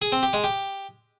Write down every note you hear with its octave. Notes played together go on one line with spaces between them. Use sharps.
G#4
C4
G4
G#3
G4